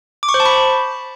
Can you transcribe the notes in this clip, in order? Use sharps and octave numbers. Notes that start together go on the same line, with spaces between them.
D6
C#6
C5
A5
B5